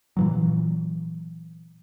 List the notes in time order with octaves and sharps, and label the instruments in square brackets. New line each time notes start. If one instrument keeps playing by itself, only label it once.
[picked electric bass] A#2 E3 F#3